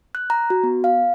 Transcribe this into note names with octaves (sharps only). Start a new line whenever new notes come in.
F#6
A#5
F#4
B3
F5